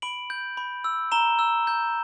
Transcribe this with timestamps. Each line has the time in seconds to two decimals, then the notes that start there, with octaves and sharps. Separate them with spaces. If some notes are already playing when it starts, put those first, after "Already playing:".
0.02 B5 D7 F#7
0.30 G6
0.57 B5
0.84 E6
1.12 A#5 E7 G7
1.39 E6
1.67 G6